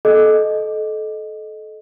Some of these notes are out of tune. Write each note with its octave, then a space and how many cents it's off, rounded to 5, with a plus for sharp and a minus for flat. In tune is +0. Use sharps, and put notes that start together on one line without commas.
A4 -25 D#5 -10